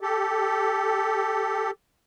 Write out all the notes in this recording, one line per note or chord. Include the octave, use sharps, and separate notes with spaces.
G4 A4